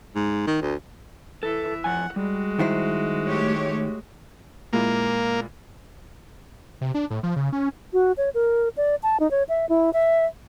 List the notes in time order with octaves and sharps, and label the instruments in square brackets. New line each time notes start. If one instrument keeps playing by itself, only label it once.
[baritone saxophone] G#2
D#3
D2
[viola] E3 E5 [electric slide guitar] A4
[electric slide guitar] F2 G#5 [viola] F#5
[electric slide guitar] G3 [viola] G#3 F#4
[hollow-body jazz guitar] D#3 E4 C5
[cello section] A3 G4 C#5
[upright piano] A#2 G#3 E4 [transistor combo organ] A#3
[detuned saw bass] C3
D4
A2
F3
C#3
C#4
[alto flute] F#4
C#5
A#4
D5
A5
D#4
C#5
E5
E4
E5